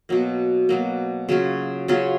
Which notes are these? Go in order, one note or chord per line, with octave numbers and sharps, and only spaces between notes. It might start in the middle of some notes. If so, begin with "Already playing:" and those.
B2 F#3 A#3
B2 F#3 A#3
C#3 F#3 C#4 F4
C#3 F#3 C#4 F4